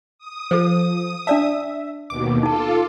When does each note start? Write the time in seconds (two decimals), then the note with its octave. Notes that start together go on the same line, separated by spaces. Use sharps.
0.19 D#6
0.51 F3 A4 C5
1.27 D4 D5 E5 A5
2.10 D#2 B2 D6
2.43 D#4 F4 A4 A5